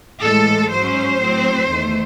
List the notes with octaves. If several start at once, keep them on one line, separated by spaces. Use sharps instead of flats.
A2 E3 G#3 A4
G#2 F#3 C#4 C5
A2 F#3 C4
E2 D#3 A3